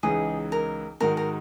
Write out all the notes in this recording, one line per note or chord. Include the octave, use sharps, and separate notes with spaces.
C#2 C#3 E3 G#3 D#4 G#4
A#4
G#2 D#3 G#3 D#4 F#4 A#4
A#4